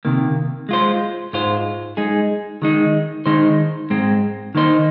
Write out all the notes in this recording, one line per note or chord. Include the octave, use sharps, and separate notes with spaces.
C3 D#3 A#3
G#3 F4 C5
G#2 G#3 F4 C5
G#3 D#4 G#4
D#3 G#3 D#4
D#3 G#3 D#4 C5
G#2 G#3 C4
D#3 A#3 D#4 C5